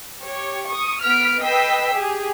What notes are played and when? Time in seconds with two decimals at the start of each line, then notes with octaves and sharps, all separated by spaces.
0.23 G4 C#5
0.67 C#6 D#6
1.01 B3 F6 B6 D7
1.41 B4 D#5 G5 E6 B6 C7
1.92 G4 G#4